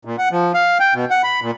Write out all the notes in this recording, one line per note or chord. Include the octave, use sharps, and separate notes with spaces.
A#2
F#5
F3
F5
G5
B2
F#5
B5
A#2